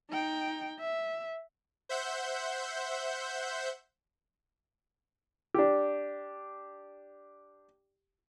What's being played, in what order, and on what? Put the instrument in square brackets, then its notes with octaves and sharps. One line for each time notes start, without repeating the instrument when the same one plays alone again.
[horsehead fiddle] D#4 G5
E5
[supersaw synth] C5 E5 F#5 G6
[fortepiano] D4 G4